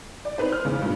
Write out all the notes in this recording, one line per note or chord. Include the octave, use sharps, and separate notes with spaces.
D5
C4 D#4 B4 C5
F6
E2 C#3
G2 A#2